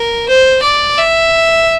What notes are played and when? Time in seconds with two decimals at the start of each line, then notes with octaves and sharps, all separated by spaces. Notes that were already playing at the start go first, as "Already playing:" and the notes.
Already playing: A#4
0.29 C5
0.63 D5
0.98 E5